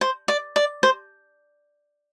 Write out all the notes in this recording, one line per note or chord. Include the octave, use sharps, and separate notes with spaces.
C5
D5
D5
C5